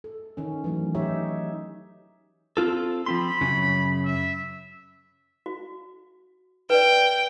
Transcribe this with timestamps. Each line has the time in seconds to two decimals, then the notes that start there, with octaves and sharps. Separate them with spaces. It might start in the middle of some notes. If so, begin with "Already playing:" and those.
0.04 A4
0.37 D#3 C#4
0.64 E3 F#3 A3
0.95 D#4 G4 C#5 E5
2.57 C4 F4 A4
3.06 F3 C4 B5 C6
3.41 F#2 C#3
4.05 E5
5.46 F#4
6.70 B4 D5 G5